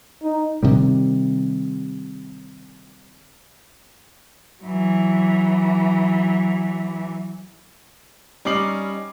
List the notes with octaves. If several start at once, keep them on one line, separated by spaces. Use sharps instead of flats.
D#4
C3 D#3 G3
E3 F#3
G3 C#4 D#4 D6 C7 F#7